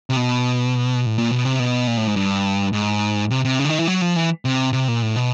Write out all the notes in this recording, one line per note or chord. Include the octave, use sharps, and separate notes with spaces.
C3
B2
A2
A#2
B2
C3
B2
A#2
A2
G#2
G2
G#2
C3
C3
C#3
D3
D#3
E3
F#3
F3
E3
C3
C3
A#2
A2
B2